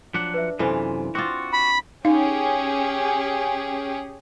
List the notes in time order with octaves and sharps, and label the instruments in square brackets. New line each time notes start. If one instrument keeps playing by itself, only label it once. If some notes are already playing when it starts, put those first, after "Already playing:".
[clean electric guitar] F3 F#3 F#5 [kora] D4
[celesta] B4 E5
[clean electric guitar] F#2 C3 [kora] E3 F4 [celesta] A4 C5 G#5
[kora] C4 F4 [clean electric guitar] F#4 [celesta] C6 D6 A6
[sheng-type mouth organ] B5
[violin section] C#4 G4 G#4 [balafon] D#4 F5